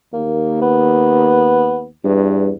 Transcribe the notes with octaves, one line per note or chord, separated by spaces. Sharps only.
D#2 A#3
B3
E2 G2